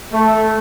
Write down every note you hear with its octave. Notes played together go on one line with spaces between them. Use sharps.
A3